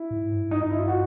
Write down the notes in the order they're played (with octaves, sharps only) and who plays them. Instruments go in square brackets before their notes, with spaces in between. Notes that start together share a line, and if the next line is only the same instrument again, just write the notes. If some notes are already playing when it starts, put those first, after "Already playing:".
Already playing: [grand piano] E4
[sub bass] A2
G#2
G2
G#2
[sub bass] G2 [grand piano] D#4
[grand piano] D#4
E4
F4
F#4